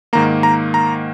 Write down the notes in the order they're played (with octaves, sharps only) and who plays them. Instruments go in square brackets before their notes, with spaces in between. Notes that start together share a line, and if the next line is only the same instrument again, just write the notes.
[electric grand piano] G#2 D#3 A#3 A#5
A#5
A#5